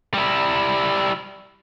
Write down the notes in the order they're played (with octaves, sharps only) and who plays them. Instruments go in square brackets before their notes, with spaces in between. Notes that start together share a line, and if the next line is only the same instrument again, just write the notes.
[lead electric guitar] G3 E4